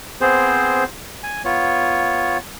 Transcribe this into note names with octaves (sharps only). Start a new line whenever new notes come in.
B3 C4 G#4 C5
G#5
B3 F4 C#5